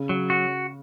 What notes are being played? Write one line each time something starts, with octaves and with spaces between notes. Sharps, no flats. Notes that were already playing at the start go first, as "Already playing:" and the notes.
Already playing: C#3
F#3
F#4